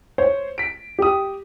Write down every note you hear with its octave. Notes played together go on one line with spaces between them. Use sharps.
C5 C#5
B6 D7
G4 D#6